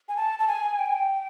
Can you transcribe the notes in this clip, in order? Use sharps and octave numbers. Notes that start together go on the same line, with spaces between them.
G#5
A5
A5
G#5
G5
G#5
G5